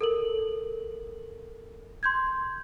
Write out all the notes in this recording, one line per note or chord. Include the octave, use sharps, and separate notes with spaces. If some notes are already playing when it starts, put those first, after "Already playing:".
A4 A#4 F#7
C6 G6 G#6